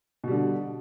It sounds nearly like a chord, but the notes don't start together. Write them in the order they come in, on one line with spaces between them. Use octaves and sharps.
B2 G3 D3